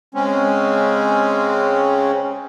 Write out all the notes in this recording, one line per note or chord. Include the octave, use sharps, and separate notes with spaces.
C#3 G#3 C4 C#4